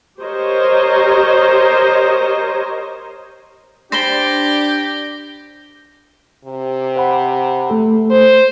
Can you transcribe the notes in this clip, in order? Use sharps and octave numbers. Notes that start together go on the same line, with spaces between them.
G4 A#4 C5 C#5 D#5
D4 G4 C5 D5 B5 A#6 G7
C3
C5 F#5 B5
A3 A4
C5